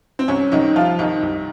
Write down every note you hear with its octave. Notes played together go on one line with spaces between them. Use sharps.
C4
C2 C#4
C2 D#3 D#4
C2 F3 F4
C2 D#3 D#4
C2